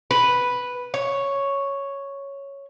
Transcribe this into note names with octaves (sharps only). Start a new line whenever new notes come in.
B4
C#5